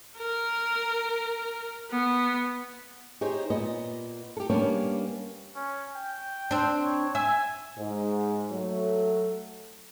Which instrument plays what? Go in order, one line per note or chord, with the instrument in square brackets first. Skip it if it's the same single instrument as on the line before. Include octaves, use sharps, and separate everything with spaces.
[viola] A#4
B3
[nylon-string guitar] D#4 G4 G#4 C5 C#5
A#2 B3 D#5
G4 A4
G3 A#3 B3 C#4 D4 C#5
[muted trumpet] C#4
G5
[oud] C4 D4
[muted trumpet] C#5
[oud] E5 [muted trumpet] G#5
[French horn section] G#2
F#3 A3